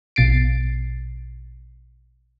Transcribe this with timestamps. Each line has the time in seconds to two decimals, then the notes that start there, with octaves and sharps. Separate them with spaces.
0.16 A#1 B2 A6 C7 D7